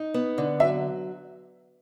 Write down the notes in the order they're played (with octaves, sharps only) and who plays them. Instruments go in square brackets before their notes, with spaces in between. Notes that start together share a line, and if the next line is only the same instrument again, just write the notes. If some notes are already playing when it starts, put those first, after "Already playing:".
Already playing: [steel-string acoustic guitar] D#4
B3
D3
[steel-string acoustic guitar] F#3 [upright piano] E5